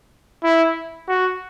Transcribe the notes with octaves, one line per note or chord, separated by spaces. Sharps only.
E4
F#4